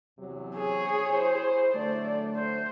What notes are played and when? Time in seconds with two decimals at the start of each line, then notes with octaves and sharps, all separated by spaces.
0.19 E2 C3 F#3
0.56 G#4 C#5
1.10 E4 C5
1.74 D3 F#3 A3 D5
2.36 C5